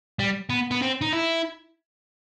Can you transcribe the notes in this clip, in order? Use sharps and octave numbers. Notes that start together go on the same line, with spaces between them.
G3
B3
B3
C4
D#4
E4